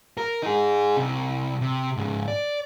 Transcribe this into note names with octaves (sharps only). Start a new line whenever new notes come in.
A#4
D#4 G#4
C2 C3
C3
G#2 C#3
D5